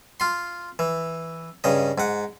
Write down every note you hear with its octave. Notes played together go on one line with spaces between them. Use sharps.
F4 C6
E3
G2 C#3 D#5
G#2 F#5